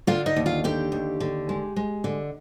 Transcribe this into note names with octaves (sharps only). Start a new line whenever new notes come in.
D3 F4 F5
D#4 D#5
D#2
F4 F5
D3 G4 G5
D#2
D3
G#3
G#3
D3